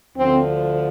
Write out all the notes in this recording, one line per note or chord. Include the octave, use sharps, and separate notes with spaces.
D2 D3 F3 C4